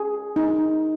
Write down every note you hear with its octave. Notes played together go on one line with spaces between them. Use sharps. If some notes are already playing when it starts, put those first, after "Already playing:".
Already playing: G#4
D#4